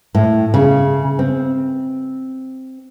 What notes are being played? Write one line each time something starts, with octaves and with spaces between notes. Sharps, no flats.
A2
C#3
C4